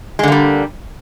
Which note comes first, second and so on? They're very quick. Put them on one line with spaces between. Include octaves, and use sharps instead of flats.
G#3 D3 A#3 G3